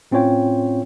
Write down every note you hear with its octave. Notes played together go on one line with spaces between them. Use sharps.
A2 C4 C#4 F4 C#5 G5